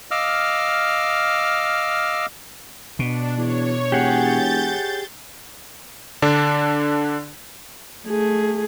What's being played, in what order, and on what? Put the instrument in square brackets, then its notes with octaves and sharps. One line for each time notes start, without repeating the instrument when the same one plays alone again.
[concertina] D#5 F5 D6 E6 F6
[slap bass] B2 [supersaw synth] D4
[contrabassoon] E2 [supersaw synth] C#5
[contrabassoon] E1 [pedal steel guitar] G4 G#4 F#5 [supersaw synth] G6 A6
[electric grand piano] D3 D4
[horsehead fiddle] A3 G#4